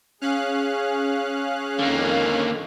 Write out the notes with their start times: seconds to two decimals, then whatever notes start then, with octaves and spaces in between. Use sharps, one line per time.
0.21 C#4 G#4 F5 F#6
1.79 F2 D3 D#3 A#3